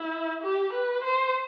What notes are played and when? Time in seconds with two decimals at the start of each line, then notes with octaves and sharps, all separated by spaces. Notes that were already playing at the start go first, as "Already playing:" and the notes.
Already playing: E4
0.43 G4
0.73 B4
1.03 C5